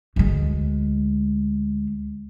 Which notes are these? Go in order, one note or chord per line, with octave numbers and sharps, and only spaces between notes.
D2 G#3